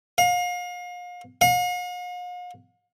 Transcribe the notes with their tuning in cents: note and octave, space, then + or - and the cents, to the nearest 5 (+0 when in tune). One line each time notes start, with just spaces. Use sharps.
F5 +35
F5 +45